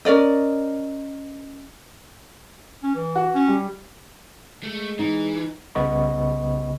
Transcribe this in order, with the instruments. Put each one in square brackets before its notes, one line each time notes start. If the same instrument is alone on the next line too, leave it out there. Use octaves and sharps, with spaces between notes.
[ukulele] C#4 A#4 D5 D#5
[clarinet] C#4
E3
[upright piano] F#4
[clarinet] C#4
[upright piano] G3
[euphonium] G#3 [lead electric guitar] A3
[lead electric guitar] E3 [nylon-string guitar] D#4
[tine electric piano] C2 C#3 B3 D#5 B5 C#6